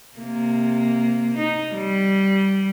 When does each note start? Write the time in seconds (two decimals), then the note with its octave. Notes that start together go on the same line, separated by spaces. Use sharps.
0.18 C3 A#3
1.38 D#4
1.74 G3